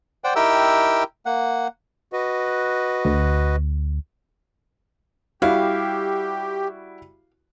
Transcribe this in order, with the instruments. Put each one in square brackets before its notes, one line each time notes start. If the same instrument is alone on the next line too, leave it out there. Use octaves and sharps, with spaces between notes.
[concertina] C5 D5 F#5 G5
D#4 E4 G4 A#4 G5 E6
A#3 F#5
[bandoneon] F#4 B4 D#5
[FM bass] D2
[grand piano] G3 E4 F#4 [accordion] G4 [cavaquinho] F5